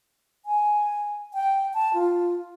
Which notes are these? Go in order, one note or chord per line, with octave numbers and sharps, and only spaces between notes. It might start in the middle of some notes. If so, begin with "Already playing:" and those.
G#5
G5
A5
F4